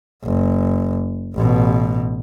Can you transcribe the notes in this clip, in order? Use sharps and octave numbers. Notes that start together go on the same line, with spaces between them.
F#1
A1 B2